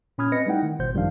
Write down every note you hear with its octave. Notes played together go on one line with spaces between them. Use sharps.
A#2 C#4 B5 D#6 F6 G#6
C4 B4 D#5 A#6 C#7
G3 A3 D#4 E4 F#5 G5
D#3
G#1 B2 C5 G6
F#2 D#3 F3 G3 D4 F5